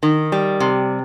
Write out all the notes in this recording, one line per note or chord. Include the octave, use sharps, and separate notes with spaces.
D#3
G3
C3